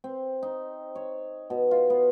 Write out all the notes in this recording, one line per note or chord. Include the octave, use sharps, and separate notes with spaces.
C4
D#4
C#5
B2
F4
B3